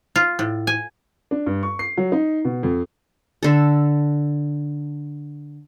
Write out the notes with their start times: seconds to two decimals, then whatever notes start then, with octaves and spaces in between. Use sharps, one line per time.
0.16 F4
0.39 A2
0.67 G#5
1.31 D4
1.46 G2
1.63 C#6
1.79 C7
1.97 F#3
2.12 D#4
2.45 B2
2.63 F2
3.43 D3 A4